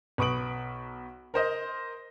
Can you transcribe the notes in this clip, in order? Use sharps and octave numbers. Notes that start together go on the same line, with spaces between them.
B1 B4 C#6 D#6 D7 F#7
A#4 C5 D#5